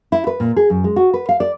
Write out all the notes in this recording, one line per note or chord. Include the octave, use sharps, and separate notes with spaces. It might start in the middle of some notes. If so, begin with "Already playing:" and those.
E4
B4
A#2
G#4
F#2
G#3
F#4
B4
F5
D5